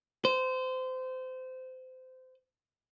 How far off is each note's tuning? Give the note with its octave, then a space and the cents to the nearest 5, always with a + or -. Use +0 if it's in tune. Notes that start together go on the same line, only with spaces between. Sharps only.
C5 -25